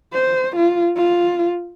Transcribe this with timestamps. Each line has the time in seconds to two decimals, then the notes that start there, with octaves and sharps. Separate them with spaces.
0.13 C5
0.56 F4
0.96 F4